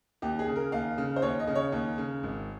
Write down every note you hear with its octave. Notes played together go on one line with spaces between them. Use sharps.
D#2 G4
G#4
C#3
A#4
D#2 F5
C#3
C5
D#2 C#5
D#5
C#3
C#5
D#2
C#3
G#1